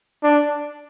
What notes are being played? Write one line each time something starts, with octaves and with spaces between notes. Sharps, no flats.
D4